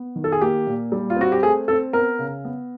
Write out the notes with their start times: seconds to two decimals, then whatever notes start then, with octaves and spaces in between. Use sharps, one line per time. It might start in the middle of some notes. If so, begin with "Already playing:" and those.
Already playing: B3
0.16 D#3
0.24 A4
0.32 G#4
0.41 A#3 G4
0.67 A#2
0.92 G3
1.10 F4
1.16 C4 F#4
1.32 G4
1.43 A3 G#4
1.68 C4 A4
1.93 B3 A#4
2.19 C#3
2.45 B3